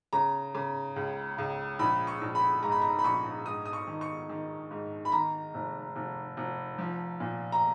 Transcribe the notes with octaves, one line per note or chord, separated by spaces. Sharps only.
C#3 A#5
C#3
C#2
C#2
A#1 B5
C#6
A#1
B5
G#2 A#5
B5
A#5
B5
A#1 C#6
G#2 D#6
D#6
C#6
D#3
C#6
D#3
G#2
B5
D#3 A#5
F1
F1
F1
F3
A#2
A#5